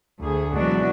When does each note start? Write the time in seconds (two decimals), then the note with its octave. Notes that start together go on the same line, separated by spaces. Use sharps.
0.20 D2 G#4
0.54 B2 E3 F#3 G#3 D4 F#4